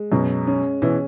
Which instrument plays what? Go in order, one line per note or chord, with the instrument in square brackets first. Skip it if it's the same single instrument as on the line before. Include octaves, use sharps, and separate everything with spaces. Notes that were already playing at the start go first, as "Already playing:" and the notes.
Already playing: [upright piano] G#3
[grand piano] F#2 B2 [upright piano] C#4
[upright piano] C#4
[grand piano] B2 E3 [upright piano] C#4